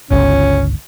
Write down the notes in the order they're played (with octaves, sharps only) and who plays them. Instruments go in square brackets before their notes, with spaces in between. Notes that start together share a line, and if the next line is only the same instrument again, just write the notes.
[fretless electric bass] G1 C#2 [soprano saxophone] C#4